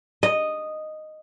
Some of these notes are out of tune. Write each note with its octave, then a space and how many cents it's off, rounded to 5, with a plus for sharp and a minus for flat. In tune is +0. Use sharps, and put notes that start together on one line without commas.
D#5 -5